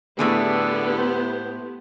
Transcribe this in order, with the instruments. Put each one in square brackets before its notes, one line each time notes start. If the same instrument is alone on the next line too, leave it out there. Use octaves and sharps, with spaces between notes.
[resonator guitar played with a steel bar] A2 A3 G#4 [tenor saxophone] D3 [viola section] B3 E4 G4
[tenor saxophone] C5